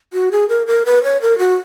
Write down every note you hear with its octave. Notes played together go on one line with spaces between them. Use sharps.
F#4
G#4
A#4
A#4
B4
C#5
A#4
F#4